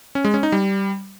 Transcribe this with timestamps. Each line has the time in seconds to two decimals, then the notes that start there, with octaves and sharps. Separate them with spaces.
0.15 C#4
0.25 G#3
0.34 C#4
0.43 D#4
0.52 G3